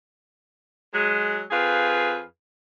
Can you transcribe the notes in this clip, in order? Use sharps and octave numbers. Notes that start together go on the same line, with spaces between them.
F#3 G#3
F2 G#4 B4 F5